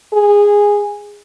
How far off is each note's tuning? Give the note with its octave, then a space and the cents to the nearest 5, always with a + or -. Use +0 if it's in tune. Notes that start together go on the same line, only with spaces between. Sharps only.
G#4 -15